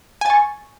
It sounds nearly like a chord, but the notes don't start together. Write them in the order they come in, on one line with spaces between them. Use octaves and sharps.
G#5 A6 C#6